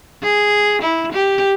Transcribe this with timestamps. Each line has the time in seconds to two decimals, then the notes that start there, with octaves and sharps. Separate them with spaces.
0.23 G#4
0.82 E4
1.13 G4